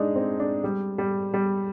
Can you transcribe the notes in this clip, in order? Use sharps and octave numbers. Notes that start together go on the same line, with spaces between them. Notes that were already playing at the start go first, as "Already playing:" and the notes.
Already playing: G#3 D4 D#4
C4
D4
G3
G3
G3